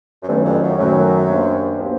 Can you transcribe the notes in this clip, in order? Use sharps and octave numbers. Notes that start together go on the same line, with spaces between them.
F#2
G2 D#3 F#3 A3 C#4
F2
F#2
F#2 D#3 F#3 A3 C#4
A#3 D4 G4 C5
A#3 D4 G4 C5